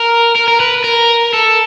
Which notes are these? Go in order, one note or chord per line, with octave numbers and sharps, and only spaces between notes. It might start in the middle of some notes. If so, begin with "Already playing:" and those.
Already playing: A#4
A#4
A#4
B4
A#4
A4